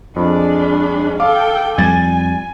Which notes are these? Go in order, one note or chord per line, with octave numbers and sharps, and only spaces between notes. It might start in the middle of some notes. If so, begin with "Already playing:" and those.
F2 G#3 D4
A4 F5 G5 D6
F2 G3 G#5 G#6 A6